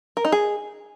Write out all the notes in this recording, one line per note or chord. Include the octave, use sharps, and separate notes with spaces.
A#4
D#4
G#4